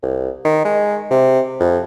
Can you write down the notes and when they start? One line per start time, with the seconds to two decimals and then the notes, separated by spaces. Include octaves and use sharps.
0.03 C2
0.45 D#3
0.65 G#3
1.11 C3
1.60 F2